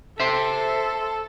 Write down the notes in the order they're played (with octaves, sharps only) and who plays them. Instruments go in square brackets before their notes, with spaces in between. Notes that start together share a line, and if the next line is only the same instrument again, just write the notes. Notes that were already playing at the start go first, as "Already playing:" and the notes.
[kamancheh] A4 [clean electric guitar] C5 E5